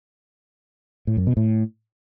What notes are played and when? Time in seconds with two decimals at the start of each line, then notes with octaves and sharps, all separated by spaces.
1.07 A2
1.17 F#2
1.27 B2
1.37 A2